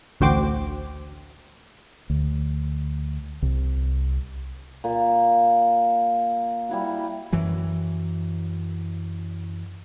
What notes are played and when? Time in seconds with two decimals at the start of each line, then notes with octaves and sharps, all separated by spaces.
0.20 A1 D2 F#4 C5 G5 D6
2.10 D2
3.42 C2
4.84 A#2
6.69 G3 E4 F#4
7.33 F#2 E3 F#3